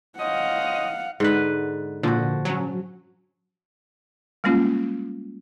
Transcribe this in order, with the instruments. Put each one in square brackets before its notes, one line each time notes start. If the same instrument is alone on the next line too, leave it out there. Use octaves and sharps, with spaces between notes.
[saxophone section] F3 C#4 D#5 [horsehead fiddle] F5 F#5
[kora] G#2 D3 B4
[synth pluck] A#2 D3 [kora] F3 F#4
[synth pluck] F#3 C#4
[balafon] G3 G#3 A#3 C#4 F4